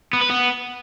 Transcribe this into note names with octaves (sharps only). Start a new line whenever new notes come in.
B3
B4
B3